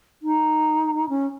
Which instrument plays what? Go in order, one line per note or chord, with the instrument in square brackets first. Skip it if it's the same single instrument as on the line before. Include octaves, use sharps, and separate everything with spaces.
[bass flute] D#4
C#4